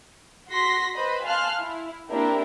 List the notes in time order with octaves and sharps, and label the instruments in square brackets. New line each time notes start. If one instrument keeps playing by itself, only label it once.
[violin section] F#4 C6 A#6 B6
B4 C5 D#5 B5
F5 G#5 A5 C6 F6 F#6
E4
A#3 C4 D4 E4 G4 A#4